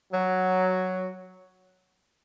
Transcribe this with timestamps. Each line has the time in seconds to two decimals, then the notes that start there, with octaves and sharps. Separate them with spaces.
0.13 F#3